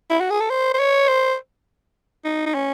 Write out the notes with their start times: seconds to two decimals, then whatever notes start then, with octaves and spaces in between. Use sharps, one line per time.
0.10 E4
0.20 F#4
0.30 G#4
0.40 A4
0.50 C5
0.74 C5
0.79 C#5
1.08 C5
2.25 D#4
2.46 D#4
2.54 C#4